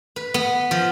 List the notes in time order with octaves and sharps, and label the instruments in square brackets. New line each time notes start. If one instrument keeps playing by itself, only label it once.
[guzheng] B4
B3
F3